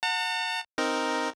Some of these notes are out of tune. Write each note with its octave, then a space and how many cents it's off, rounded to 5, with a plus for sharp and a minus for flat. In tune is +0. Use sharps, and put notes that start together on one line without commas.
F#5 -20 A5 +45
C4 +0 D#4 +0 A#4 +0